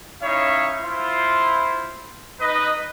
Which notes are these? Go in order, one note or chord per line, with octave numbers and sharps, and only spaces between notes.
C#4 D#4 E4 C#5 E5 F5
E4 F4 C5
D#4 B4 D#5